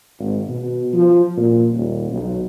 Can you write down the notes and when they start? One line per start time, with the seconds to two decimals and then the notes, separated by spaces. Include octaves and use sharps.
0.19 G#1
0.48 B2
0.93 F3
1.37 A#2
1.71 D#1
2.10 B1